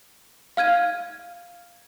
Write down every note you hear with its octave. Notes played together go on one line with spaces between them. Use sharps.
F5 F6 G#6 D#7